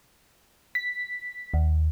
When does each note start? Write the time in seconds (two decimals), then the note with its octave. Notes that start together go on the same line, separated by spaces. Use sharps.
0.75 B6
1.54 D#2